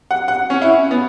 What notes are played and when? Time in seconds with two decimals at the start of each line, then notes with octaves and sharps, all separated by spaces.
0.11 F#5
0.28 F#5
0.50 C#4
0.62 E4
0.91 B3